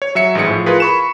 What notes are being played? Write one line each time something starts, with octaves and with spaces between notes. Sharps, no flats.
C#5
F#3 E5 C#7
A1 G#2 G#4 C#7
A2 F3
F4 G#4 A#4 B4
B5 C#6 E7